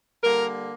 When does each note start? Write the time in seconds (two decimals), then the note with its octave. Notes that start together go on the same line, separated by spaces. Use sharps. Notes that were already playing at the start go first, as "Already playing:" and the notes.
0.22 D3 G3 A#3 A#4